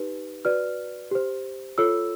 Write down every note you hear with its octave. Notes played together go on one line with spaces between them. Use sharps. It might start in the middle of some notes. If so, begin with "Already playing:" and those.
Already playing: D#4 G4 B4
F#4 B4 D5 F6
G4 C5
F4 A4 C#5 E6